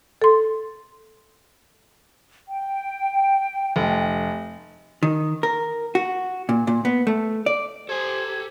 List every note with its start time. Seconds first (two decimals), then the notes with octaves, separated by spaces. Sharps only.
0.22 A4 C6
2.48 G5
3.76 F1
5.03 D#3
5.43 A#4
5.95 F#4
6.49 A#2
6.67 A#2
6.85 B3
7.07 A3
7.46 D5
7.89 G4 A4 C5 G#5 G#6